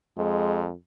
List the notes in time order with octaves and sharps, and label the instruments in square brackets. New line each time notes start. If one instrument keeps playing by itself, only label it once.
[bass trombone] F2 [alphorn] G#3